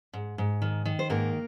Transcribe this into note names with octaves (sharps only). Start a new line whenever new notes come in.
G#2
G#2
D#3
D#3
C5
G#2 A#3 A#4